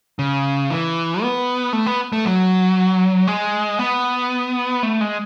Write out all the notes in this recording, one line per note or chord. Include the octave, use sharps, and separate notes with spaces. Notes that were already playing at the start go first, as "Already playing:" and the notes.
C#3
E3
B3
A3
B3
A3
F#3
G#3
B3
A3
G#3